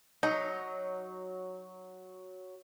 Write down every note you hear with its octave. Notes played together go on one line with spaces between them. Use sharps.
F#3 D#4